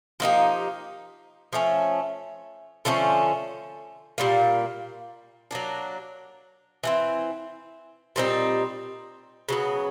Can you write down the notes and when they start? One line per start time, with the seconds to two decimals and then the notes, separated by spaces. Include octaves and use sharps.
0.20 F3 A#3 D#4 G4
1.53 F3 A3 C#4
2.85 D3 F3 A3 C#4
4.18 A#2 G3 A#3
5.51 F#3 A#3 D4
6.83 E3 A3 C4
8.16 A#2 G3 C4 D#4
9.48 C#3 F#3 B3